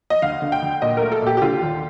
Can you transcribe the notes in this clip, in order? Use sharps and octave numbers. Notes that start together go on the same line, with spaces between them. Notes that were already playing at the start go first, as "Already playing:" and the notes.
D#5
D2 F5
D3
G5
D2
A#2 D#5
A3 A#4
A4
A#2 G4
G4
D3 F4
D#2